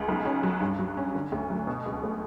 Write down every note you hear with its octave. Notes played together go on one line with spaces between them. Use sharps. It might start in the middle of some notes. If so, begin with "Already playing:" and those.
Already playing: C#2
B1
C#4
F#3
G2
F#3
C#4
D3
D2
F#3
B2
C#2
A3